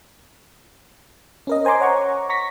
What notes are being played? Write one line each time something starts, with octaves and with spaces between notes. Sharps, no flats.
C#4 A#4 D#5
C5 G#5 A#5 C6 D6
C#5 F#5 A#5 C#6
A#5 C#6 A#6 B6